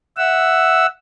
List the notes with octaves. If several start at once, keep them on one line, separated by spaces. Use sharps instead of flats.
E5 F#5 E6